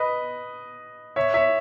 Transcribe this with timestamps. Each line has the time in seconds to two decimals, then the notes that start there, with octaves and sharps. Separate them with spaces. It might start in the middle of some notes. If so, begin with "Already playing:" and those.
Already playing: B4 D#5
1.16 C#5 E5
1.34 C#5 E5